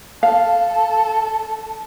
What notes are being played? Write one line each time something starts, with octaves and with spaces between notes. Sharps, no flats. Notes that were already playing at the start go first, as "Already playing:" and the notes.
A4 F5